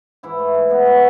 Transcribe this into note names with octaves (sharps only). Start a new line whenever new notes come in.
G#2 E3 E4
G#2 A3
G#2 A3
G#2 B2 B3
F#3 A3